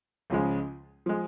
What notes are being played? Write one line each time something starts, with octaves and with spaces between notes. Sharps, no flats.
C#2 C#3 F3 G#3
F3 G#3